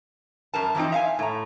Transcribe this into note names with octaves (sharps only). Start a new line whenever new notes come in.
F#2 A#4 A5
E3 F3 B3 C4 D#4
E5 F5 G#5
A2 A#5